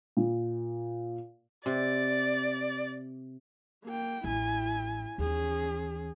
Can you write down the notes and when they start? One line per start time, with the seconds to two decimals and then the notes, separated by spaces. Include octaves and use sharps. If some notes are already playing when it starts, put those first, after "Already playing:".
0.17 A#2
1.66 C3 D5
3.85 A#3 G5
4.24 A1 E4 G#5
5.18 D#2 E3 C#4 G#4